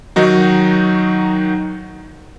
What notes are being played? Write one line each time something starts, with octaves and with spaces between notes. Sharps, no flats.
D#3 F#3 D#4 F#4